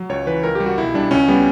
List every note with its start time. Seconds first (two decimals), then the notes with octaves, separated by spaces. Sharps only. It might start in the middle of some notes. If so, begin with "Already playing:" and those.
Already playing: F#3
0.09 C#2 C#5
0.26 E3 B4
0.43 C#2 A#4
0.55 G3 G4
0.66 F#4
0.78 B1 E4
0.94 G3 D4
1.11 C#2 C#4
1.28 G3 B3